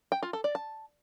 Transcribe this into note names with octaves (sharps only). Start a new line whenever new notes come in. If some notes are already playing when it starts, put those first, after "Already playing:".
G5
F4
A4
D5
A5